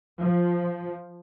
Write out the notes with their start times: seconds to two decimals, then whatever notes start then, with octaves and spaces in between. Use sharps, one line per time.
0.22 F3